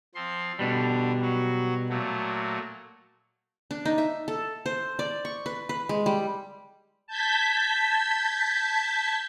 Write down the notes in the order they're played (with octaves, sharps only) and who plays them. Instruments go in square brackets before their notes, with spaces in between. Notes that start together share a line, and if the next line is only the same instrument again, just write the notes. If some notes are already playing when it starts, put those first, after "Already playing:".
[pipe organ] F3 C4 C6
[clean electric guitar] B2 G3 [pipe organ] D3 D4
[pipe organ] F#3 F#4
A#2 F#3 A3
[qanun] D4
D#4
E5
A4
C5
D5
C#6
B4
B4
G#3
G3
[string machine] A5 G6 G#6 B6